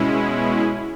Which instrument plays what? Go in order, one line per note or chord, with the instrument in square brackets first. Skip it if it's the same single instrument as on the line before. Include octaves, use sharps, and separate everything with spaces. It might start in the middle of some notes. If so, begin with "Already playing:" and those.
Already playing: [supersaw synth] B2 G#3 C#4 E4